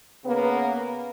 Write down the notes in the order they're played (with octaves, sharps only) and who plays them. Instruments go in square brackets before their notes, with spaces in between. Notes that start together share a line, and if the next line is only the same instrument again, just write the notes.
[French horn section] C#3 A#3 B3